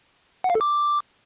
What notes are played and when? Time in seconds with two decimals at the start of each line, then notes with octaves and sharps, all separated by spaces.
0.44 F#5
0.50 F5
0.55 A4
0.61 D6